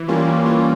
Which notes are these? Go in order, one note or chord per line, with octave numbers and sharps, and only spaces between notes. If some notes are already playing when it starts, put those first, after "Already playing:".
Already playing: E3
G3 A#3 C#4 F4
E3
G3 A#3 C#4 F4